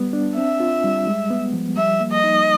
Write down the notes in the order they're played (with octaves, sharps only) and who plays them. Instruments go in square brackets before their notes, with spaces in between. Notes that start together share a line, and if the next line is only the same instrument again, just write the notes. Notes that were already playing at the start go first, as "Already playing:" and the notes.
Already playing: [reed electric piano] G3 B3
D4
[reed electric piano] C4 [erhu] E5
[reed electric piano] F4
G3
G#3
B3
F3
[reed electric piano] G3 [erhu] E5
[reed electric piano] A#3
[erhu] D#5
[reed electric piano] D#4